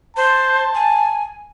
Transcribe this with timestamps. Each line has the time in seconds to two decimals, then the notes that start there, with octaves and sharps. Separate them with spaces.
0.17 C5 A5
0.75 G#5